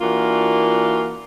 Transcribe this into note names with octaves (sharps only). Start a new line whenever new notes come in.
E3 A#3 D4 F4 F#4